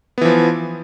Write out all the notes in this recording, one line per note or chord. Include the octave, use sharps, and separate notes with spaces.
E3 F3 B3